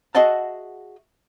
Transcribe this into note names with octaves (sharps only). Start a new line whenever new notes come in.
F#4 G#4 D#5 E5 F#5 A5